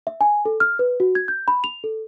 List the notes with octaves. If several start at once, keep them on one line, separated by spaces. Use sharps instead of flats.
E5
G#5
A4
F6
B4
F#4
G#6
G6
B5
F7
A4